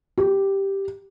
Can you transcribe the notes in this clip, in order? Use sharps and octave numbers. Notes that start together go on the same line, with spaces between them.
G4